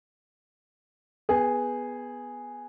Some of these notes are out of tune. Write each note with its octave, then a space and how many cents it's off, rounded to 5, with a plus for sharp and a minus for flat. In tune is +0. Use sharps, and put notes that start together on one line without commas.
B3 +0 G#4 +0 G5 +40